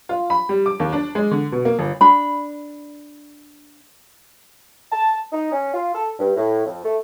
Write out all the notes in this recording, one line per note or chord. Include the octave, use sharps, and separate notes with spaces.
F4
B5
G3
D6
D#2
D4
G#3
D3
B2
A#3
G1
D4 B5
A5
D#4
C#4
F4
A4
G2
A2
F2
A3